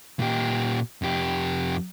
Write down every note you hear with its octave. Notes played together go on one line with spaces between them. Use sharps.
A#2 G4
F2 G4